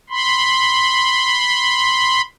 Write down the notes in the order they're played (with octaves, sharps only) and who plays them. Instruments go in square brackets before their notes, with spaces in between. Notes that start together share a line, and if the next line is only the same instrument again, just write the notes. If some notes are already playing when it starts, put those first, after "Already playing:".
[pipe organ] B5 C6